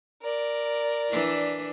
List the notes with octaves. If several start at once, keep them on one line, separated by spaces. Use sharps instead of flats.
A#4 D5
E3 D4 E4